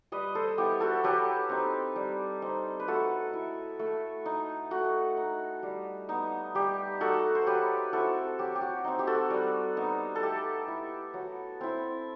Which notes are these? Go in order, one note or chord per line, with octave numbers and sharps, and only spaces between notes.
G3 B4 D#5
A4 C5
B3 E4 G4
F#4 A4
F#3 G4 B4
C4 D#4
G3
C4 D#4
B4
A3 F#4 A4
E4
A3
D#4
A3 F#4
D#4
G3
B3 D#4
G3 G4
D#4 F#4 A4
C5
F#3 G4 B4
C4 E4 F#4 A4
F#3 G4
G4
F#4
C4 D#4
G4
F#4 A4
G3
B3 D#4
A4
A3 G4
E4
F#3
C4 E4